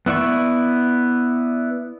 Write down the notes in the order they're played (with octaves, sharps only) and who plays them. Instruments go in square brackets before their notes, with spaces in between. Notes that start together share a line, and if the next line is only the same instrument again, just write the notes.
[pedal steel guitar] B3 E4 D5 C#6